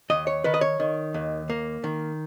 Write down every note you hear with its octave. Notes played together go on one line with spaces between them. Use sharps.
D#2 D#5
C#5
D#3 B4
D#5
C#5
D#3
D#2
A#3
D#3